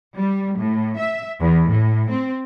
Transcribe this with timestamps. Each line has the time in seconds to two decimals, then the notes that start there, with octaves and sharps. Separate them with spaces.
0.17 G3
0.58 A2
0.98 E5
1.41 E2
1.71 A2
2.10 C4